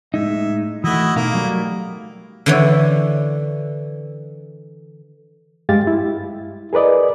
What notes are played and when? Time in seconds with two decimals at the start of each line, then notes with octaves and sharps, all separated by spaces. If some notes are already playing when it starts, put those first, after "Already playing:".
0.14 A2 G#3 D#4 E5
0.84 E3 A3 E4 F#4 D#5
1.16 B2 A#3 D#4 F5
1.34 F#3 G3 A3
2.46 D3 E3 C#5
5.69 G2 G#3 G4 F5 A6
5.87 E4
6.73 G#4 A#4 B4 D5 D#5